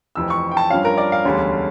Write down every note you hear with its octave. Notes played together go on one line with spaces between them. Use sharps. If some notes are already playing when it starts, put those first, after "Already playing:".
F1 F2 E3 E6
C#6
G5
A5
G2 F3 C#4 F5
A#4
D5
F5
E1 D2 D3 G3 C#4